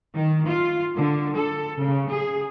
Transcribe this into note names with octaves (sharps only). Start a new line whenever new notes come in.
D#3
F4
D3
A4
C#3
G#4